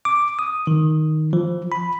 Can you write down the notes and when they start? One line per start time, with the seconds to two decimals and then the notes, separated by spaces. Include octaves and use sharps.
0.05 D6
0.39 D#6
0.67 D#3
1.33 F3
1.72 B5